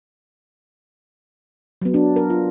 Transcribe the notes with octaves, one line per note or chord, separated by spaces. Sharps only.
F#3 B3
D4
A#4
F4